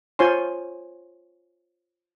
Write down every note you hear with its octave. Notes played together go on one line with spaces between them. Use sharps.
F4 C5 C#5 G#5 C6